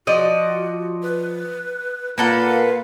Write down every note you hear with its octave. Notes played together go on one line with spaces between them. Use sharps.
F3 F#4 D5 D#5
B4
A#2 A#3 A4 B4 F5 F#5